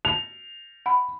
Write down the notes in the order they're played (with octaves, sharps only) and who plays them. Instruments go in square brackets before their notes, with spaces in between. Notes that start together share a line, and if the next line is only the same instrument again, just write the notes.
[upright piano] F7
[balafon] F#5 B5